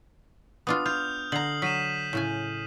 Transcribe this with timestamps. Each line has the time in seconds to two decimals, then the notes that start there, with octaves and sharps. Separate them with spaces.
0.67 B3 D4 F4 D#6
0.86 F4 F6 G6 F7
1.32 D3 A#5 C7 F#7
1.62 F#3 B6 D#7 E7
2.13 A2 C#3 G#5